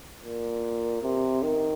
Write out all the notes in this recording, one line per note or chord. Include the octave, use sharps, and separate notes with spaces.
A#2
C3
D#3